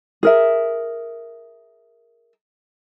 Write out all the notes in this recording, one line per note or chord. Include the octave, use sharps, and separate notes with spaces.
G#4 A#4 E5